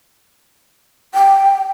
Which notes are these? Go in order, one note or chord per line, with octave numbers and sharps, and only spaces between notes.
G5